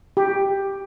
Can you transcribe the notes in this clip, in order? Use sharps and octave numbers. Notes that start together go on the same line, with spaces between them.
G4